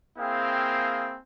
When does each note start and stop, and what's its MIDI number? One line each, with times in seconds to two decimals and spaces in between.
0.18 1.15 58
0.18 1.15 60
0.18 1.15 64
0.18 1.15 68
0.18 1.15 77
0.18 1.15 79